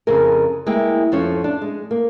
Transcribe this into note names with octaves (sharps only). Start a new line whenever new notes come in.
F2 C#3 G#4 A#4
G#3 A#3 E4 G5
F2 F3 C#4 C#5
D4
G#3
A#3